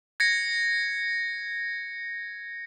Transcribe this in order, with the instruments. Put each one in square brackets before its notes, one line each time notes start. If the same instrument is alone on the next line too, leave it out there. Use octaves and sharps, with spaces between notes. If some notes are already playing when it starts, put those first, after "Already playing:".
[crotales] G#6 A#6 C#7